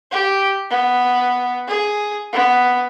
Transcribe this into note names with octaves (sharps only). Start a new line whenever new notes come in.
G4
B3
G#4
B3